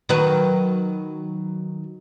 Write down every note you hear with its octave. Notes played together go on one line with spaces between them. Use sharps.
D#3 F#3 B4